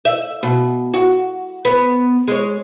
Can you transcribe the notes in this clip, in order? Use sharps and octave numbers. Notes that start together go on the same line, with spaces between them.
E5
B2
F#4
B3
G#3 C#5